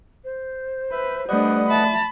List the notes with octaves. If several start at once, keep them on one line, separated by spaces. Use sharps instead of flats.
C5
B4 E5
G3 A3 D4 B4 D5 D#5 F#5
E5 A5 B5